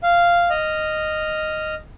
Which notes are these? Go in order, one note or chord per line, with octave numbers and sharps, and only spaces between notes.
F5
D#5 F6